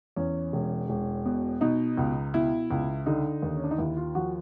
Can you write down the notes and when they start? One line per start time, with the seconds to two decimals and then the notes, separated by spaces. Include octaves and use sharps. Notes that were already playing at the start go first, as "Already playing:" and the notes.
0.16 E2 C#4
0.53 E1
0.89 E1
1.25 B2
1.61 B2 D#4
1.97 C#2
2.34 B2 E4
2.71 C#2
3.06 D3 D#4
3.42 D#2
3.56 C#4
3.64 D4
3.71 D#4
3.78 D#2 E4
3.97 F4
4.15 F3 F#4